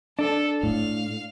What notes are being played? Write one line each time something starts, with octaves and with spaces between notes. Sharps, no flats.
D4 A4
A2 F5